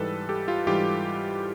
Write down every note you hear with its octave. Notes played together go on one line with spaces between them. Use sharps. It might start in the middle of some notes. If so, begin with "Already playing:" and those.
Already playing: G#2 E3 G3 A4 B4
G4 A4
F4 G4
G#2 E3 G3 F4 G4